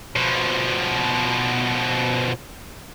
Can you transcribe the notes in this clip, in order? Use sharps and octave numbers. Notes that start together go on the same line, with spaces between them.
B2 F3